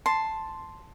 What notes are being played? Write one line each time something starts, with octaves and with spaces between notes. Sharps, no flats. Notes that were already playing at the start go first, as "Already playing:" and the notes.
A5 C6